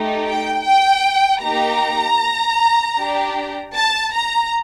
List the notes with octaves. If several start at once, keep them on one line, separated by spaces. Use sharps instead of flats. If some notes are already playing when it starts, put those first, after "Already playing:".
Already playing: A3 D#4 G4
G5
G5
A#3 D#4 G4 A#5
D4 G4
A5
A#5